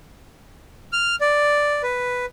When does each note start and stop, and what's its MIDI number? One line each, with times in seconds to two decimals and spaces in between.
0.93 1.16 89
1.21 1.82 74
1.83 2.26 71